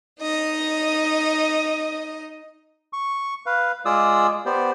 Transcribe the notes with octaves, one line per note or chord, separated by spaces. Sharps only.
D#4 D#5
C#6
B4 F5
G#3 F4 G#4 D5 D#6 E6
B3 G4 C5 D5